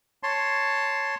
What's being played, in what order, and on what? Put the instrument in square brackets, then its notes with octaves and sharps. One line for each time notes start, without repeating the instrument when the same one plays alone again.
[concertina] C#5 A5 C6